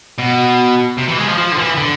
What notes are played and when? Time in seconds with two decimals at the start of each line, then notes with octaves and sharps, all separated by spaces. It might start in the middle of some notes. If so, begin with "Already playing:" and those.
0.18 B2
0.98 C3
1.08 E3
1.18 G#3
1.27 F3
1.38 F3
1.52 D3
1.58 E3
1.78 D3